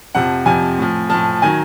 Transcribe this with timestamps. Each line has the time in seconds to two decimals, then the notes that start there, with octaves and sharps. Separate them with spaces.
0.15 F2 C3 F3 F#5
0.46 F2 C3 F3 G#5
0.78 A2 F3
1.10 A2 F3 A5
1.42 D#3 F#3 G#5